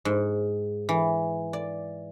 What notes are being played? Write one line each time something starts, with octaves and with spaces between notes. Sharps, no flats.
G#2
E3
D5